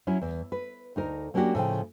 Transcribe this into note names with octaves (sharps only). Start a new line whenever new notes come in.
F#3 C#4 E4
E2
B4
D2 D#4 A#4
F#3 A#3 C#4 D4 F#4 G4
A2 C#3 F3 G5